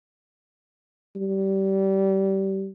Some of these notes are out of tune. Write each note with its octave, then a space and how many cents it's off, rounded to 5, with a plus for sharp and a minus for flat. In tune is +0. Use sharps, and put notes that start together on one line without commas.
G3 -20